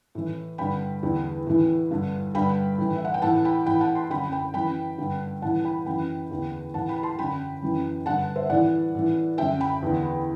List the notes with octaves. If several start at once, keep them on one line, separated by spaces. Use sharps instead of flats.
A2 E3
G2 D3 G5 B5
E2 D3
A2 E3
G2 D3
G2 D3 G5 B5
A2 E3
E5
F#5
G5
A2 E3 F#5 A5
G5 B5
A2 E3 G5 B5
F#5 A5
A5 C6
F#2 D3 G5 B5
G5 B5
F#2 E3 G5 B5
G2 D3
A2 E3 F#5 A5
G5 B5
F#2 E3 G5 B5
E2 D3
A2 E3 F#5 A5
G5 B5
A5 C6
F#2 D3 G5 B5
F#2 E3
G2 D3 F#5 A5
C5 E5
A2 E3 D5 F#5
A2 E3
F#2 D3 E5 G5
G5 B5
E2 D3